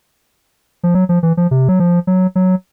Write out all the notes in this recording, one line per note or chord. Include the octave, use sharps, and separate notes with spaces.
F3
F#3
F3
E3
F3
C3
F#3
F3
F#3
F#3